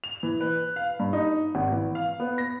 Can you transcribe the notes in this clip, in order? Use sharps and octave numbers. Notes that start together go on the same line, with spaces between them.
F7
E3
B4
F5
G2
D#4
G#1
E3
F5
B3
A#6